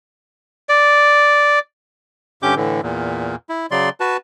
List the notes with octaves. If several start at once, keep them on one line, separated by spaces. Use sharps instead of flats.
D5
G2 D3 C#4 G4 D6 G6
A2 D3 E3
E2 A#2
E4
C#3 F#3 D5 C6
F#4 B4 A5